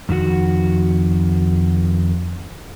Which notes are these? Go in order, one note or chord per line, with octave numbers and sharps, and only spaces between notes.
F2 D#3 F#4 F#5